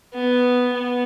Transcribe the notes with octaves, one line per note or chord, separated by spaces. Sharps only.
B3
B3